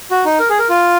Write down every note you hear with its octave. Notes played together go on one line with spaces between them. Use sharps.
F#4
D#4
A#4
G#4
A#4
F4